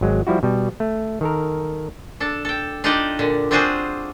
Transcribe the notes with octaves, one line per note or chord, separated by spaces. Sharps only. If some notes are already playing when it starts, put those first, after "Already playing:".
G#1 F#3 G#3
F3 G3 E4 F#4
B2 G3
A3
D#3 A4 A#4
D4 A4
A4 G5
D4 D#4 F4 G4 D5 D#5
A#2 D3
C4 D4 F4 F#4 G#4 C5